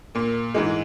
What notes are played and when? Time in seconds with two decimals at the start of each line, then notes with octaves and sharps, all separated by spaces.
0.15 A#2 A#3
0.54 G#2 E3 G#3